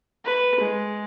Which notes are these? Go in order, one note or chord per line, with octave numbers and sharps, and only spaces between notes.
B4
G#3